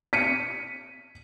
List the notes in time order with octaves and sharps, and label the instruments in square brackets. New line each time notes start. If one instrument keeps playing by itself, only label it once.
[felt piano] B6 C#7 D#7